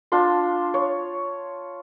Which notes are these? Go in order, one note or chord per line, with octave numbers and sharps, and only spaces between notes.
D4 F4 A5 C6
C#5